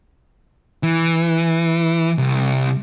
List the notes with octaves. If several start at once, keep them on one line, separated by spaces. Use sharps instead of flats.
E3
C2